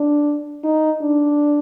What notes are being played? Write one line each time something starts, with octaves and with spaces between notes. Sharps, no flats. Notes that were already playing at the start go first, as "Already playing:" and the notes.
Already playing: D4
D#4
D4